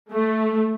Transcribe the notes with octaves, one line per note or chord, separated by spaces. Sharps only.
A3